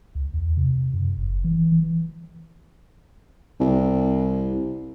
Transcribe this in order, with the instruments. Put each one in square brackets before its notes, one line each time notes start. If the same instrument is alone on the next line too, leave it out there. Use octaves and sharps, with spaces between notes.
[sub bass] C#2
E2
C3
F#2
F#1
E3
E3
[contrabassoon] C2